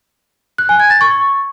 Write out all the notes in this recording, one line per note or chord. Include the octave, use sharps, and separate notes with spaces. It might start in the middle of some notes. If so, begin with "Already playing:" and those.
F#6
G#5
G#6
A6
C#6